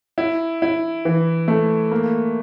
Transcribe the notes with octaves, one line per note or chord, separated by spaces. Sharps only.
E4
E4
E3
A3
A#3